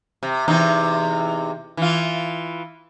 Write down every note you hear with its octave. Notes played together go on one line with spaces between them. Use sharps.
C3
E2 C3 D#4
E3 F4